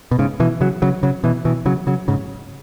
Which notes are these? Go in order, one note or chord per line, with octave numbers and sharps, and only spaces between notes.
B2
G#2 C#3
B2 E3
C#3 F#3
C#3 F#3
C#3 F#3
B2 E3
B2 E3
C#3 F#3
C#3 F#3
G#2 C#3